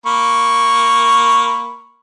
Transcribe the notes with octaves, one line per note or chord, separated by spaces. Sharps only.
A#3 B5 C#6